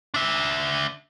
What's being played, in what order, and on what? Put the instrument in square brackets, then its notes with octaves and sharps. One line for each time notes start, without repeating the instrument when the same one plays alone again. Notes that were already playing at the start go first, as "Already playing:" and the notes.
[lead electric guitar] D4 E5